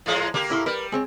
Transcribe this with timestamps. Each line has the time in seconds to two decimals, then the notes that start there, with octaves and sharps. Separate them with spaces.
0.06 A2 F3 G#3
0.34 D3 A#3 G4
0.50 A2 E4 C6
0.66 G3 A#4 B4
0.92 G#3 C4 C#5